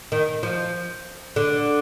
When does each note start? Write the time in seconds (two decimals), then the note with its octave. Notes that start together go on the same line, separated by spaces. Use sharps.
0.12 D#3
0.43 F3
1.36 D3